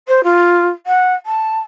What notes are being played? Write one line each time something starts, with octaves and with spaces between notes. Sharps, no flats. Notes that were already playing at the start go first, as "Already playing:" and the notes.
C5
F4
F#5
A5